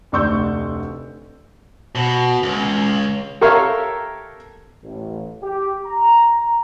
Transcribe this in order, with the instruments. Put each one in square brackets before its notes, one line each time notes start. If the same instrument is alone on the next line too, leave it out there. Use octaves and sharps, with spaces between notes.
[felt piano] F1 D2 D5 C#6 E6 G6
[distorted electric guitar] B2
C#2
[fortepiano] G4 A4 A#4 C#5 E5 F5
[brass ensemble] A1
G4
A#5